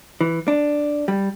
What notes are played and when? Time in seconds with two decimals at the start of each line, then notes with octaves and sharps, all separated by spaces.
0.21 E3
0.48 D4
1.08 G3